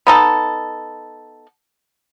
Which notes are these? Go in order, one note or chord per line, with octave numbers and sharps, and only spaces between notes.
B3 D#4 A4